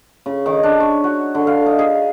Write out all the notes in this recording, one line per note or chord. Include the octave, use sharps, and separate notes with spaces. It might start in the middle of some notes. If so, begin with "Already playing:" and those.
C#3
D#3
D4
C#5
F#4
D3
F5
D#4
G#4